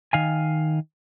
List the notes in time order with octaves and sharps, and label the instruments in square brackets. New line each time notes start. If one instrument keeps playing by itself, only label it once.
[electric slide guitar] D#3 F5 G#5